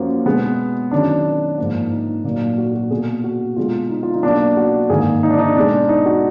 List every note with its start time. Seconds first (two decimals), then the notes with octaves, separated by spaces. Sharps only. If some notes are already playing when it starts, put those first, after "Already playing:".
Already playing: F#2 F3 A#3 F#4
0.26 B2 G#3 B3
0.91 F#2 D#3 F#3 D4
1.58 G#2 F3 A#3
1.91 D#4
2.24 A#2 F#3 A#3
2.58 F#4
2.75 F#4
2.90 B2 A#3 G#4
3.24 F#4
3.56 B2 G#3 F4
3.90 D#4
4.03 F4
4.14 D#4
4.23 B2 F#3 A#3 D4
4.57 F#4
4.90 G#2 D#3 A#3 G#4
5.23 D#4
5.31 D4
5.39 D#4
5.56 B2 G#3 D4
5.89 D#4
6.06 F#4